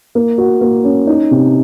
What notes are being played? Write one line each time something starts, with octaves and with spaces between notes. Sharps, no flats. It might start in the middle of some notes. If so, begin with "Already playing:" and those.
A#3
F#4
A#3
C#4
D#4
C3